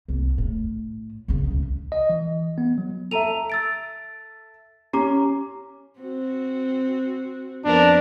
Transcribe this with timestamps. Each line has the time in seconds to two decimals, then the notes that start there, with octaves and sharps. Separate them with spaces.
0.08 C2 A#3
0.38 A2
1.28 A#1 C#3
1.51 C#2 E3
1.92 D#5
2.10 E3
2.58 B3
2.78 F#3
3.11 A4 E5 A#5 D#7 F7
3.50 E6 A6 D7
4.93 C#4 G4 A#5 D6
5.99 C4 F#4
7.65 F2 B3 D4 A#4